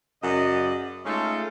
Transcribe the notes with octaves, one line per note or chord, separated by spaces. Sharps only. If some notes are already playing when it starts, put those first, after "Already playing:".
F#2 C#3 D5 D#5
G#3 A3 C#4 D#4 F4 A4